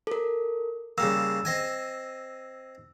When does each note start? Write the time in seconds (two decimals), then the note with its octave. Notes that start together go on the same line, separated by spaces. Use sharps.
0.07 A4 A#4
0.98 C#3 G3 A#3 E6
1.45 C4 D#5 G#5